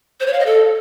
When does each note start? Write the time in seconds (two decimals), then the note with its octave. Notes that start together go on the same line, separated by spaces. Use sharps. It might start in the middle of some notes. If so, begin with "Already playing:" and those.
0.20 C5
0.27 C#5
0.33 F5
0.40 D#5
0.46 A4